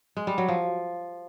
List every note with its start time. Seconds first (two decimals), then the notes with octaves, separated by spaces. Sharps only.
0.17 G#3
0.27 G3
0.38 F#3
0.48 F3